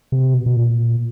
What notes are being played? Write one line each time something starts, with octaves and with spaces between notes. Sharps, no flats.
C3
B2
B2
A#2